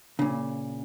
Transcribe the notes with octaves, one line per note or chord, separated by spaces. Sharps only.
A#2 C#3